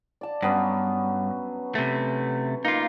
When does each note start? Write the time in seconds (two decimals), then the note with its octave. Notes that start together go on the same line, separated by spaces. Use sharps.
0.21 D5 A5
0.42 G2 F#3 B3 C#4
1.75 C3 A3
2.65 A#3 D#4 F4